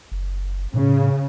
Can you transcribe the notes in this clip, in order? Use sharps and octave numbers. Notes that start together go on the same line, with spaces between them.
F#1
A2 C#3